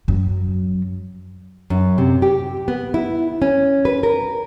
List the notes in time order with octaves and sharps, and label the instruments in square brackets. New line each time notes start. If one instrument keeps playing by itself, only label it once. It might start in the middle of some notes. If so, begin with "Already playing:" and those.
[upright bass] F#2 F#3
[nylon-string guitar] F#2
C3
G4
B3
E4
C#4
B4
A#4